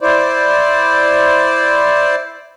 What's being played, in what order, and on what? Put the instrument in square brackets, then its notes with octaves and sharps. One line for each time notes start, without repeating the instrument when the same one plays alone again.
[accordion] E4 C5 D5